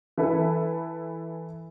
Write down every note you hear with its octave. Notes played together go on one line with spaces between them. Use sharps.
E3 E4 A4 B4